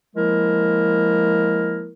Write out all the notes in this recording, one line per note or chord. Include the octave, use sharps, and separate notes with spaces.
F3 G#3 A#3 E4 A#4